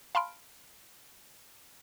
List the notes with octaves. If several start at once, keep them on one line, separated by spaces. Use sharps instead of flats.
F5 A5 B5 C6 F6 D7